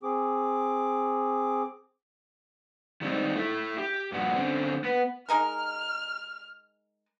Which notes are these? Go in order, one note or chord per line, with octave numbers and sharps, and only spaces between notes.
C4 G#4 D6
D#3 G3 G#3 C4 D#4
A3 E4 E5
G4
G2 A#2 F#4
D3 C4 C#4
B3 B4
G#3 D#4 A#4 F6